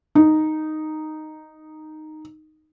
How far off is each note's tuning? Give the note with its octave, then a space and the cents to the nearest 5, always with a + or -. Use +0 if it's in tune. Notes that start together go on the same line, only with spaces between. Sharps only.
D#4 -5